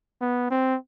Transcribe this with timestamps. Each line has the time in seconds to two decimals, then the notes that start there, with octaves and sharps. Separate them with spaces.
0.21 B3
0.51 C4